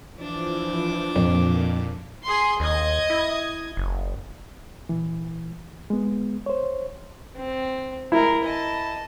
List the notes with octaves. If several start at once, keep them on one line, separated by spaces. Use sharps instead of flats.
E3 F3 D4 D6
F2 A#2
G#4 C6
D#2 D#5 G#6
E4
F#1
A#2 E3
G#3 B3
C5 C#5
C4
G#3 E4 A#4
D#5 A5